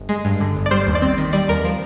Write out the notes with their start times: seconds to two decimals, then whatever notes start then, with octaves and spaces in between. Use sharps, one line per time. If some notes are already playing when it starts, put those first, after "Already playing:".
Already playing: G1
0.09 G#3
0.25 G2
0.40 D3
0.56 G1
0.66 D5
0.71 G3 C5
0.87 D#2
0.95 D5
1.02 C4
1.18 D#3
1.33 G3 D5
1.48 D#2 A#4
1.65 F3